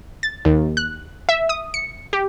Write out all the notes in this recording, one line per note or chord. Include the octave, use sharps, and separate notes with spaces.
A6
D#2
F#6
E5
D#6
C#7
G4